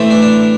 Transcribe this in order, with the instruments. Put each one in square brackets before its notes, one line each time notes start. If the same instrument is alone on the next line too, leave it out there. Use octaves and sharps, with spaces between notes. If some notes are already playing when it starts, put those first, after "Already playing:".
Already playing: [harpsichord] A2 E3 A3 C4
D4
D4